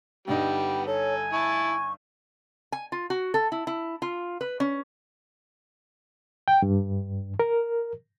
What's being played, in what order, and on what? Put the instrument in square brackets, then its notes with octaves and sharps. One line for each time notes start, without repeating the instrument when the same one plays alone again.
[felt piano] G2 D3 D#4 [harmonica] G3 B3 [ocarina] G5
[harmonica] A4 [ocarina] C#5 [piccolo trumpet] G#5
[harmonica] E4 A5 [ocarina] C#6
[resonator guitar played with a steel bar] G#5
F4
F#4
A4
E4
E4
F4
B4
C#4
[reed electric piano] G5
G2
A#4